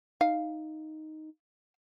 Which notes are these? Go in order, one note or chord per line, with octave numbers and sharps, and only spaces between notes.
D#4 F5